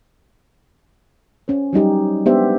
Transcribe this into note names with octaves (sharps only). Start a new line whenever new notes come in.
C#4 C5
F#3 G3 D#4 G4
G#3 B3 D4 G4 C5 E5